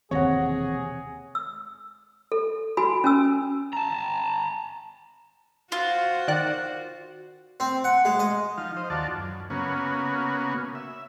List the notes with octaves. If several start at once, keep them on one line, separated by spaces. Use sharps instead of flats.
E1 D#2 C3 C4 G#4 C#5 F#5 A#6
E6
A4
F#4 G#5 B5
C#4 G#5 E6
A5 A#5
F4 F#4 C5
D#3 D5 F#6
C4
F#5
G#3
D#5
F3 D#4 F5
C5 D#5
D#2 F4 F#4 D5 A5
F#2
C#3 A#3 B3 C#4 F#4
E5